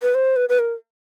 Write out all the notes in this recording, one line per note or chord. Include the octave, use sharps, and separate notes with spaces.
B4
C5
B4
B4
A#4